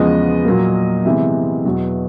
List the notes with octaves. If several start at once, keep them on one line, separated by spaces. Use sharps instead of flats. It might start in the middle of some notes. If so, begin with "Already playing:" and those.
Already playing: E2 C#3 F3 G#3 B3 D#5
A#2 F#3 A#3
C3 E3 G#3 B3 E5
E2 B2 F#3 B3